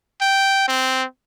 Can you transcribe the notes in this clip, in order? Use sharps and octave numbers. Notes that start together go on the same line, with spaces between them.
G5
C4